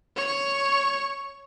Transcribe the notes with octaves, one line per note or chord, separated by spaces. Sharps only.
C#5 C#6